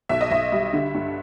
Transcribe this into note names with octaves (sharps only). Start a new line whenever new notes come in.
B1 E5
D#5
B1 E5
G3
D3
G2